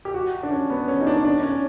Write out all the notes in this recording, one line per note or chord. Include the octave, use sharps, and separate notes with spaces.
G4
F#4
D4
C#4
B3
C#4
D#4
D4
D4
C#4